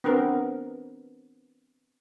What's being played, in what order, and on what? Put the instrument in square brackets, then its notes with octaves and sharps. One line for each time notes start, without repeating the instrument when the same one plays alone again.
[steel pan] B3 C4 D4 A#4